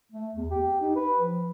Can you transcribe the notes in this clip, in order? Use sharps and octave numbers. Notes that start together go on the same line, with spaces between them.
A3
E2
G4
D#4
B4
F3